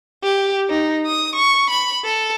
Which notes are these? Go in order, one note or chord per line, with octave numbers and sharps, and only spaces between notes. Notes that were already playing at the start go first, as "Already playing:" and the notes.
G4
D#4
D#6
C#6
B5
A4